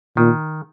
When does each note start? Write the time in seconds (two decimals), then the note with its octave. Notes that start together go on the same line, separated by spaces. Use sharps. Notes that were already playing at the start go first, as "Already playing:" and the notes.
0.17 A#2 D#3